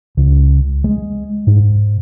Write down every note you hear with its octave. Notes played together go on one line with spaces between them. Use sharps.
C#2
G#3
G#2